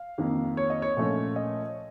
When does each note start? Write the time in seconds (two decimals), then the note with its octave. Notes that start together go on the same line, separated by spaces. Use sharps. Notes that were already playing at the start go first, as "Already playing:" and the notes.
Already playing: F5
0.18 F2 D#3 A#3
0.57 C#5
0.70 D#5
0.82 C#5
0.97 A#2 F3 A3 C#4
1.36 D#5